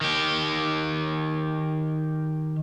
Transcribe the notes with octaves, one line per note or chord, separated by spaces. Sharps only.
D#3 G4